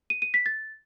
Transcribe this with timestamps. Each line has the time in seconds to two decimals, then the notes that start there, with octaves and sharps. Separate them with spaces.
0.10 D#7
0.22 D#7
0.34 B6
0.46 A6